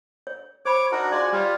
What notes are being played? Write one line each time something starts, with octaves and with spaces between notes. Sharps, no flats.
C#5
C5 C#5 B5 D6
D4 D#4 F#4 A#4
G#3 F4 D5 G#5
G3 F4 C#5 D5 F5